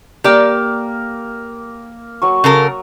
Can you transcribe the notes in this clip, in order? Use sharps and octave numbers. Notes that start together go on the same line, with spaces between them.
A#3 G4 A#4 D5
F#3 C#6
C#3 A4 A#4